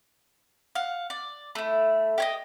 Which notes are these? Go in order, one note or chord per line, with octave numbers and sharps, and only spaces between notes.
F5 F#5
D5
A3 E4
G4 C#5 D#5